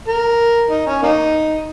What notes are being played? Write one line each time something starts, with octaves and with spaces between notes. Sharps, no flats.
A#4
D#4
C#4
A#3 D#4